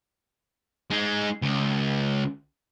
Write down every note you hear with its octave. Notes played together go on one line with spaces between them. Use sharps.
G#3 D#4
C#2